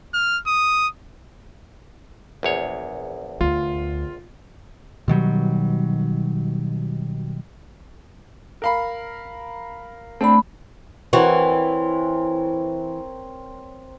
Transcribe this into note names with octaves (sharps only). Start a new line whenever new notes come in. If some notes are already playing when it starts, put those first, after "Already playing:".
F6
D#6
A#1 E2 C#5
D2 F4
B2 D#3 F#3 G3
A#4 F5 B5
A3 C4 D4 B5
E3 C4 F#4 A#4 C#5